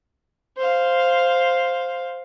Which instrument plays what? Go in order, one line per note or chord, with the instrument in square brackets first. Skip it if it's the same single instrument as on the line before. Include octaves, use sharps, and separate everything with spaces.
[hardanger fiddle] C5 F5